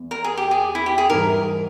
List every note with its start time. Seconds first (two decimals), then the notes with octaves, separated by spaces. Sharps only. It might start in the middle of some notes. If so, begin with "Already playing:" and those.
Already playing: E2
0.11 A#4
0.24 G#4
0.37 G4
0.51 G#4
0.75 E4
0.86 G4
0.98 G#4
1.09 G#2 E3 G3 A#4